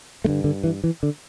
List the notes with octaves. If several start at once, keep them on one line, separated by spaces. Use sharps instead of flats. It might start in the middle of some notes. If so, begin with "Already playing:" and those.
G2 D3 A3
D3
E3
E3
D3